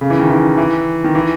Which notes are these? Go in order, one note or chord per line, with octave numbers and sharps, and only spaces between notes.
C#3
E3
D#3
E3
E3
D#3
E3